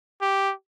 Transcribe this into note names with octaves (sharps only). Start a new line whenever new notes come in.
G4